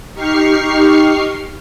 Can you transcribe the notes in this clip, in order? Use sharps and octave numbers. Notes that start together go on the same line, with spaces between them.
D#4 G4 C#6 F6 C7